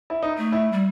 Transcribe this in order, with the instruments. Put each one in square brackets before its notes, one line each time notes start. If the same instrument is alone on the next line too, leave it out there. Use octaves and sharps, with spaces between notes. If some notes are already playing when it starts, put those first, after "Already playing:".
[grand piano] E4
D#4
[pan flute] A3
[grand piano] E4
[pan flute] G3